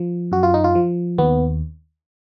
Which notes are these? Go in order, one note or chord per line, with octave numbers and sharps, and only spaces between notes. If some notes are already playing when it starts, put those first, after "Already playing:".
Already playing: F3
F#2 F#4
F4
D#4
F4
F3
D#2 B3